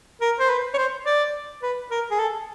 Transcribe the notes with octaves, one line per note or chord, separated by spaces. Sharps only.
A#4
C5
B4
C#5
C5
D5
B4
A#4
G#4
A4